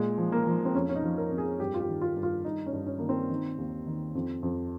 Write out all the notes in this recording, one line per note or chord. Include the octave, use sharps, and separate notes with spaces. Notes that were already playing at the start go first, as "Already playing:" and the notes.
Already playing: A#2 G#3
F3
A#3
F3
C4
F2 C#4
C#4
D#4
F3
A#4
F2
G#4
G2 G4
F4
G4
D#3
F4
G2
F4
G2 D#4
C#4
G2
C#4
D#3 A#3
C4
D#3
D#2
D#3
F2
F2